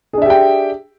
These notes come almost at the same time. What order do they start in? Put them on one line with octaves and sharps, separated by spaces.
G#4 D4 E5 G4 G5